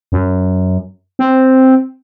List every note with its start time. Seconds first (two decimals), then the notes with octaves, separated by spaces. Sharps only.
0.12 F#2
1.19 C4